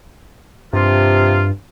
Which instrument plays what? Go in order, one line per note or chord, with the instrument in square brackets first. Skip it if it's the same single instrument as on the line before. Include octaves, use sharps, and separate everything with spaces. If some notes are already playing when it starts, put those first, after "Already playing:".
[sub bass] G2 [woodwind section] C3 F3 F4